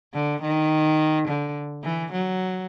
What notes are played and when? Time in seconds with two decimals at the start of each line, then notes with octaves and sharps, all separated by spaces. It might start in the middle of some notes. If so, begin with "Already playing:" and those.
0.14 D3
0.42 D#3
1.28 D3
1.84 E3
2.12 F#3